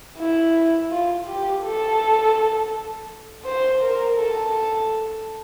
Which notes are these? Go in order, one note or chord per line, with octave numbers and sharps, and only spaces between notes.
E4
F4
G4
A4
C5
A#4
A4